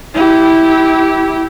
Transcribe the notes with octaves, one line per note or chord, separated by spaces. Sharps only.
E4 G4